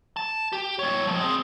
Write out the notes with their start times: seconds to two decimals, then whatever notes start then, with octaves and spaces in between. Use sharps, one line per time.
0.17 A5
0.52 G4
0.79 G3 C#5
1.07 F3 G#3
1.20 C4 G#4